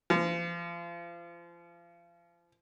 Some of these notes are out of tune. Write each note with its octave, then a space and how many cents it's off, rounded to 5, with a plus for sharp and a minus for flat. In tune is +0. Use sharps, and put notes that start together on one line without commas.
F3 -35